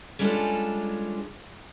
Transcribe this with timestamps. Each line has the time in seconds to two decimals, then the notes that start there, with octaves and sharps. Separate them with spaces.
0.19 G3 G#3 C#4 D4 F4 A4